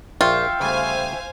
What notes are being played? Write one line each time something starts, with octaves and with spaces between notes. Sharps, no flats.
A#1 F4 E5 G5 C#6
C#3 G3 A3 C5 F5 G#5